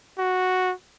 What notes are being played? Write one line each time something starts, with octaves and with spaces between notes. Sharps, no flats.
F#4